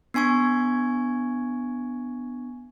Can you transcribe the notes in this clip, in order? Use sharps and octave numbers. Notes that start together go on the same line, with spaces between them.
B3 D4 G#5 C#6 G#6